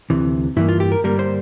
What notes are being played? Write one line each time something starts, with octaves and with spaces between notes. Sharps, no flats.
D2 C3 E3
G2 E3 A#3 E4
F4
G4
A#4
G2 D3 G3 A#3 A#4
C5